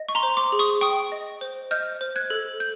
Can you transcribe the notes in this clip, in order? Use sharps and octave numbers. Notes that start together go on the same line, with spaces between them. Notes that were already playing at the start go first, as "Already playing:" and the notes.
Already playing: D#5
C#6
A#5 C6
C5
C6 D6
G#4
C#6 D#6
G5 C#6 D#6
D#5
C5
D#5 F6 G6
C5
F#6 G#6
A4
G6